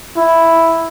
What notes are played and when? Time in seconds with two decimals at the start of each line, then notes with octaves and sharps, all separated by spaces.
0.17 E4